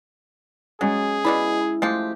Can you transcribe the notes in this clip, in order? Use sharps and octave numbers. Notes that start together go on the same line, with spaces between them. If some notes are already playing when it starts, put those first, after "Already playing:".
F#3 G#3 C#4 G#4 A6
B2 E4 D5 B5
F3 G#3 A3 G4